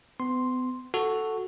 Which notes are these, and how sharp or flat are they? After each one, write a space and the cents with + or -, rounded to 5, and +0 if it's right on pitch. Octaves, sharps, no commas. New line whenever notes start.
B3 +40 C6 +0
F#4 +0 A4 +0